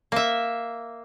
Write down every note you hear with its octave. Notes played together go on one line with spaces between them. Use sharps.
A#3 E5